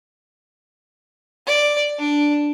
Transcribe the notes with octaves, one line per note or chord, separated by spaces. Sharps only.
D5
D4